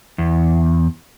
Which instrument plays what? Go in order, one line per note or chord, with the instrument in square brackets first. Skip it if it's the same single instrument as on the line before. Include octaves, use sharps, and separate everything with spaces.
[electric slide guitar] E2